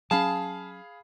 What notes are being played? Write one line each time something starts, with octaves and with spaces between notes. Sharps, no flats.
F#3 C#4 G#4 F5 A5 B5